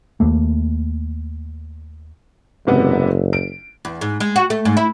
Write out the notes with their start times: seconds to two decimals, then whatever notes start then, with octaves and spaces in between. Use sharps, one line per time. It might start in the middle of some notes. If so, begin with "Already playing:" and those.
0.20 D#2 A3 A#3
2.67 F#1 G#2 C3 B3
3.33 D7
3.85 E2
4.01 G#2
4.20 G#3
4.36 F#4
4.50 A3
4.65 G#2
4.77 E4